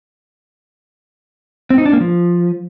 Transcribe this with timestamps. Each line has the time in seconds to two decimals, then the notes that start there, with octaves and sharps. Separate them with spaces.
1.70 C4
1.78 D#4
1.85 D4
1.93 A#3
2.00 F3